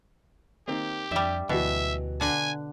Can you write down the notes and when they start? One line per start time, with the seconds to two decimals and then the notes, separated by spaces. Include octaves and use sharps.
0.68 D#3 A#3 C4 G4
1.11 F2 G3 D4 E5
1.49 D2 B2 E3 F#3 E5
2.21 D3 F#5 G#5